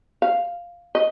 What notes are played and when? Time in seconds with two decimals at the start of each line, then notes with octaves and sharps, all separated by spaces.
0.22 F5
0.95 D#5